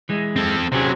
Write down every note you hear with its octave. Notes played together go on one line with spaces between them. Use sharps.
E3 G#3
C4 A4
C3 F#3 C4 C#4 G#4